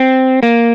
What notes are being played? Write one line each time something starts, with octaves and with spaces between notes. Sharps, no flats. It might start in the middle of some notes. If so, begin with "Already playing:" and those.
Already playing: C4
A#3